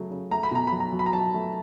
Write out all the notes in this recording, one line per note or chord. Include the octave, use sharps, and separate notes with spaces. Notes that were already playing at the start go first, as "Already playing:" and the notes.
Already playing: C#3 F#3 A3
C#3
A3 A#5
B5
B2 A#5
B5
F#3
A#5
F#3
B5
A#5
F#3 A5
A3